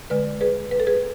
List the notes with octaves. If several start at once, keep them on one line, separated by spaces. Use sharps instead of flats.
D3 G#3 B4 D5
G#4 B4
B4
A4
G#4 B4